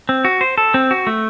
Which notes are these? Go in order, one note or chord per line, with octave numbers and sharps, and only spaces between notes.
C4
F#4
C5
A4
C4
F#4
A3